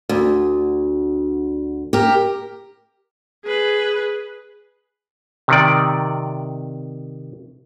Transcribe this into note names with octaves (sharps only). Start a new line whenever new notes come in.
D2
G4 A#4
G#4 B4
C3 D#3 D5